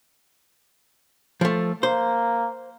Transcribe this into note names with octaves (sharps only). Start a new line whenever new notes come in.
F3 A3
A#3 C5